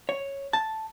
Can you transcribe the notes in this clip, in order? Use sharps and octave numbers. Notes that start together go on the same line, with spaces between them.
C#5
A5